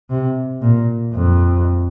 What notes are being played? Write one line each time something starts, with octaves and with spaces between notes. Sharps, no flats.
C3
A#2
F2